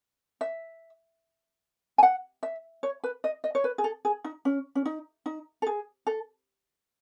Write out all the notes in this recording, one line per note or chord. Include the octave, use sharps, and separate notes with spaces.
E5
G#5
F#5
E5
C#5
B4
D#5
D#5
C#5
B4
G#4
A4
G#4
D#4
C#4
C#4
D#4
D#4
A4
G#4
A4